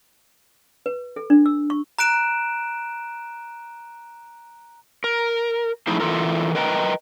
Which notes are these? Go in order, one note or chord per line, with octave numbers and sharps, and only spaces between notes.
B4
A4
D4
E6
C#6
A#5 F#6 D7 E7
A#4
F3 A3 D#4 E4 G#4 C5
E3 F4 A4 A#4
A#4 B4 D#5 G5 A5 A#5